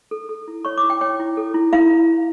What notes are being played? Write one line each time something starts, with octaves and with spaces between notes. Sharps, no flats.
A4
A4
E4
C#5 C#6
D6
E4
G5
C#5 G5
E4
A4
E4
E4 F5